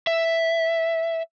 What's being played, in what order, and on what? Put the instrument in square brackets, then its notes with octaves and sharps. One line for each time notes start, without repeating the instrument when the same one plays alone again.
[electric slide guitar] E5